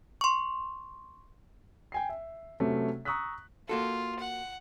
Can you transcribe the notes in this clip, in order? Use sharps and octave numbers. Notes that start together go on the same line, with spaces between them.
C6 C#6
G5 G#5 C7
E5
C3 F#3 A3 B3 C#4
A#5 C#6 D#6 E6 F#6 B6
A#3 F4 F#4 A4
F#5